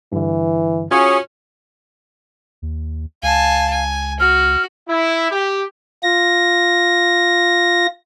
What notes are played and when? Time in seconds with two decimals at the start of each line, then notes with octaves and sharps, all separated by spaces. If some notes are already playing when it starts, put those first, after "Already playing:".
0.13 G2 D3 E3
0.91 C#4 F4 F#4 G#4 C#5
2.62 D#2
3.23 C#2 F5 G#5 A5
3.71 G#5
4.20 F#4 F6
4.88 E4
5.31 G4
6.03 F4 A#6